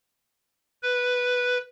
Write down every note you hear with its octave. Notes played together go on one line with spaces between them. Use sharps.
B4